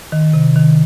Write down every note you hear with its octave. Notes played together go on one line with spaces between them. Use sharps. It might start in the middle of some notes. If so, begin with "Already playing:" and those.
D#3
C3
D#3